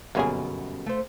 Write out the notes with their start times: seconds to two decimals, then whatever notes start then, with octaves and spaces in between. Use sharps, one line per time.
0.15 G1 F#2 B2 A#3 C#4 G#4
0.86 A3 C5